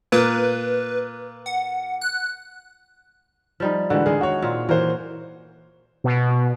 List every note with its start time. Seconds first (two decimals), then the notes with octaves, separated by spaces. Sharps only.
0.12 A#2 B4
1.46 F#5
2.01 F#6
3.60 F3 G3 D#4
3.90 D3 E3 G3 G#3 F#4
4.06 D#3 G#3 D#4 G#4
4.21 F#4 C#5
4.42 A#2 C4 F4
4.69 E3 F#4 A#4 C5 C#5
6.04 B2